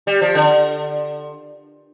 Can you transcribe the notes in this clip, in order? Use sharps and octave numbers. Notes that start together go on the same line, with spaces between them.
G3
F3
D3